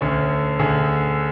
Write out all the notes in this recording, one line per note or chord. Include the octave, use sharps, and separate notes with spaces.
D2 D3 C#4
D2 D3 G#4